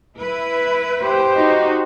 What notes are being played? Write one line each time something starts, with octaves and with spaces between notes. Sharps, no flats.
E4 B4
G4 C5
D#4 F#4